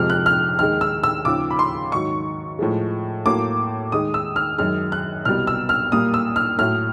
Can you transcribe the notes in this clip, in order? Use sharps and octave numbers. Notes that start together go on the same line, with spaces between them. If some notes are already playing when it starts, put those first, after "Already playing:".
Already playing: F2 C3 F3 G#3 F6
F#6
F6
D#2 D#3 G#3 F6
E6
E6
D#2 C#3 F3 D6
B5
C6
G#2 D#3 F#3 C#6
A2 F3 G#3
A2 F#3 A#3 D6
D#2 D#3 G#3 D#6
E6
F6
F#2 D#3 G#3 F6
F#6
C2 B2 G3 F6
E6
F6
A#2 G3 A#3 D#6
E6
F6
A2 F#3 A3 F6